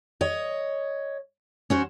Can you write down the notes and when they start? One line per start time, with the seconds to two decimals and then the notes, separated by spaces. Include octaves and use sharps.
0.21 C#5 D#5
1.70 C#4 F#4 C5